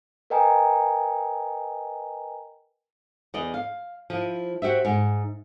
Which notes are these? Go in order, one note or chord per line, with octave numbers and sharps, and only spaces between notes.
A#4 B4 D#5 G5 G#5 A#5
E2 D5 D#5
F5
F3 E4
F#4 G4 C5 E5
G#2